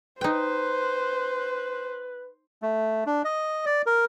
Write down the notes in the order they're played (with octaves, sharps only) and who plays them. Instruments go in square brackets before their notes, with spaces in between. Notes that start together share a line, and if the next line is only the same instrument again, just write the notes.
[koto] D#4 G5 [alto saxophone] B4 [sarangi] C5
[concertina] A3
D4
D#5
D5
A#4